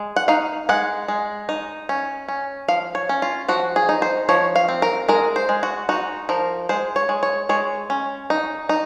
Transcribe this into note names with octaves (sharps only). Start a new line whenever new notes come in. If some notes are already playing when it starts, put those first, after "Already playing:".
Already playing: G#3
F#5
D#4 F5
G#3 F#5
G#3
D#4
C#4
C#4
F3 F5
C#5
C#4
F4
F3 F#4
G#4
D#4
C5
F3 C#5
F5
C4
A#4
G#3 A#4
C5
G#3
F#4
D#4 F#4
F3 A#4
G#3 C5
C#5
G#3
C#5
G#3 C#5
C#4
D#4
D#4